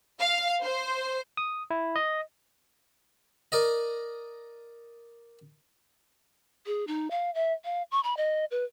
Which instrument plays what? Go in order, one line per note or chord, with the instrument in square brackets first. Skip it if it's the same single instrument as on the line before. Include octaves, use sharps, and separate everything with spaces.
[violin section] F5
C5
[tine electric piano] D#6
E4
D#5
[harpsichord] A#4 D5 D#5
[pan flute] G#4
D#4
F5
E5
F5
C#6
B5
D#5
B4